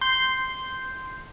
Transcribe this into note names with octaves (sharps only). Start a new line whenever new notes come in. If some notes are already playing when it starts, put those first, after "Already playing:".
C6 G6